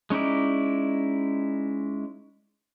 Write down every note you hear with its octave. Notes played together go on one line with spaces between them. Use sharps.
G#3 C#4 D#4 E4 D5